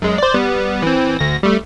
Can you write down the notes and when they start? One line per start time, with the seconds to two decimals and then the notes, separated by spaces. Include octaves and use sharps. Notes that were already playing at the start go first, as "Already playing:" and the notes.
0.02 F#2 G#3
0.18 C5 D5
0.34 G3 B3
0.82 E3 C4
1.19 D2 A#6
1.43 G3 A3